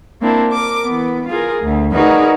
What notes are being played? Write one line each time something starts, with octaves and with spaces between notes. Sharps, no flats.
A#3 C4 D4 E4
A#4 D6
E3 B3
F4 G#4 A#4
D2
D#4 F#4 G#4 A#4 B4 D5